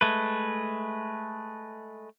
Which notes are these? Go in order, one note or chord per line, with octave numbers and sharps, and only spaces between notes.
G#3 A3 B4